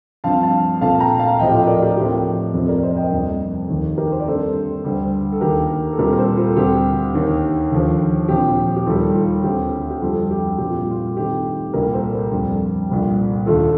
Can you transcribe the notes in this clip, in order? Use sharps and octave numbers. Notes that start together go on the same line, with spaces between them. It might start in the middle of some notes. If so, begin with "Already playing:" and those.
G2 F3 C4 F5 A5
F5 A5
A#2 A3 C4 F5 A5
A5
G5 A#5
F5 A5
A2 F3 C4 D#5 G5
G4
F4 A4
A#4 D5
G4 A#4
A2 F3 C4 G4
F2 C3 F3 C4
A#4 D5
C5 D#5
D#5 G5
F2 C3 G3 A#3
D#2 D#3 A#3
G4 A#4
C5
D5
G2 D3 A3 C4 A4 C5
D2 D3 G3
A4
D#2 D#3 A#3 G4 A#4
A4
A#2 G3 C4 G4 A#4
A#4
A4 C5
F4 A4
D2 D3 G3 C4 G4
D#2 D#3 A#3
D#2 D3 F3
A#2 F3 C4 G4
G4
D#2 D#3 G3 A#3 F4 A4
F4 A4
D2 D3 A3 C4 G4
G4
F2 D3 G3 F4 A4
G4
A#2 G3 C4 G4
F4
F4
G2 D#3 A3 C4 G4
C2 A#2 G3 A#3 G4 A#4
A4 C5
F2 D3 G3 C4
C2 A#2 G3
D#2 D3 A3 F4 A4